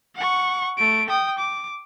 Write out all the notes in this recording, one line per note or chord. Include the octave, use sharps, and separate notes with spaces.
F#5 C#6
A3 D7
G5 D#6
D6